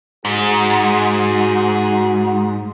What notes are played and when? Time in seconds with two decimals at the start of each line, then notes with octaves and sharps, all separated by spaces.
0.25 G#2 F#4 G#4